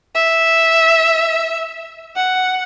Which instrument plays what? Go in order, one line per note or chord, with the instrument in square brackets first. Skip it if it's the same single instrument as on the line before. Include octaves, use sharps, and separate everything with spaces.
[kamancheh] E5
F#5